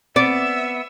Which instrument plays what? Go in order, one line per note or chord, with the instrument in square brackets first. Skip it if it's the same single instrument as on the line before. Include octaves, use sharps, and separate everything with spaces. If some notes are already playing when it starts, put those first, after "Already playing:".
[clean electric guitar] B3 [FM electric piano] C4 [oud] D5 [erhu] E5